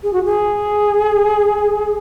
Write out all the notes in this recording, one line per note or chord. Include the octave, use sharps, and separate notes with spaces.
G#4
F#4
G#4